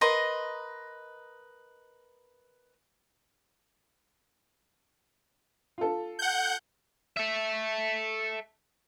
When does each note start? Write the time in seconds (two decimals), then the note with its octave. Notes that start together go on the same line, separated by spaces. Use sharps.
0.01 A#4 B4 D#5 C6
5.78 F4 A4
6.19 F#5 G6
7.17 A4 E5